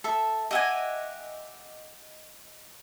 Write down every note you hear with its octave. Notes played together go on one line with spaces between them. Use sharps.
A4 E5
G4 D#5 E5 F#5 G#5